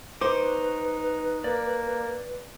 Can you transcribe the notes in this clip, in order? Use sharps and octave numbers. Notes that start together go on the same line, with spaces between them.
D#4 B4 C5 C#6 D6
A#3 D5